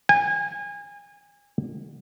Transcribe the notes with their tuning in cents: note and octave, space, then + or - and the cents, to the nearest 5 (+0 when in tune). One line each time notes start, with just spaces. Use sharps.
G#5 -30